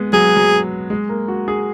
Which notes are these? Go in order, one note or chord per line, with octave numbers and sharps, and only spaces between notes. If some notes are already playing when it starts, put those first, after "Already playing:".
Already playing: G#3 B3
F#3 G#4
F#3
G#3
A#3
F#4
G#4